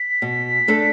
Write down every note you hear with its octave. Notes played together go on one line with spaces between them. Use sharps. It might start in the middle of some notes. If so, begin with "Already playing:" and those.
Already playing: B6
B2
A3 D4 A4